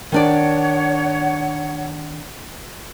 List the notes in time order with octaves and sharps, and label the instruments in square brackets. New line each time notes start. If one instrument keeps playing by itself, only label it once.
[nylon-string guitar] D#3 D4 D5 [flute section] C#5 F#5